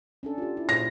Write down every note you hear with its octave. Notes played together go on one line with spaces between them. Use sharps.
C#4 D4 A4
F4 G4
E4
A#2 C5 A#6